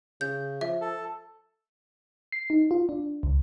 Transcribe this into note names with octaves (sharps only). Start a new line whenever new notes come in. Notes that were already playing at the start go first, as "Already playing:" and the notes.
C#3 G6
F3 E5
A4
C7
D#4
F4
D4
C#2